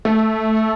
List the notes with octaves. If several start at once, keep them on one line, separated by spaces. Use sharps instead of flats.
A3